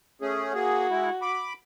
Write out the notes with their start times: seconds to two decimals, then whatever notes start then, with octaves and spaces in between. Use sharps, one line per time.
0.21 A3 C#4 G#4
0.54 A#3 F#4 G#4
0.90 G#3 E4
1.22 B5 D6